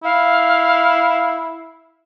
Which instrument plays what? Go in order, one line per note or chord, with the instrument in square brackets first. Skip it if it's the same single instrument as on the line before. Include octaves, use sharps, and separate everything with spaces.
[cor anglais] E4 [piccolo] F5